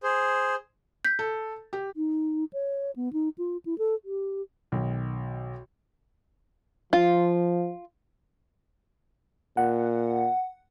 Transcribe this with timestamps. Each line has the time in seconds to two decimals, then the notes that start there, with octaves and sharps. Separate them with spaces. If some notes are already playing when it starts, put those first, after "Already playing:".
0.03 G#4 C5
1.05 G6 B6
1.19 A4
1.73 G4
1.96 D#4
2.53 C#5
2.96 B3
3.13 D#4
3.38 F4
3.66 E4
3.78 A4
4.05 G4
4.72 B1 D#3
6.93 F3 F4
9.57 A#2 F#5